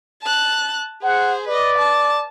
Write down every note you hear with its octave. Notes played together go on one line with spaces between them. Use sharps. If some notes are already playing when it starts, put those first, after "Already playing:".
A5 F#6
G#4 C5 F#5
B4 D5 D#5
A5